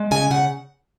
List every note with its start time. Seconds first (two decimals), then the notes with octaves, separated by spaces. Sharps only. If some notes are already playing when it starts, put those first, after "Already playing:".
Already playing: G#3
0.11 C#3 G#5
0.31 C#3 F#5